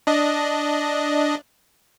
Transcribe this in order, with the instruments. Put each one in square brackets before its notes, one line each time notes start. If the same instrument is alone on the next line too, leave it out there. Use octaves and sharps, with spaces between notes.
[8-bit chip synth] D4 D#5